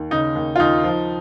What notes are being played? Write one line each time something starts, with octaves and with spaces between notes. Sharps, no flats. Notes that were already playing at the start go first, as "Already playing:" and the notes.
Already playing: D#2
C#3 D#4
D#2
F4
D#2 D#4
F3